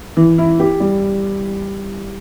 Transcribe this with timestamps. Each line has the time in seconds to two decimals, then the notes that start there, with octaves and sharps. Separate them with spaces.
0.17 E3
0.38 E4
0.60 G4
0.80 G3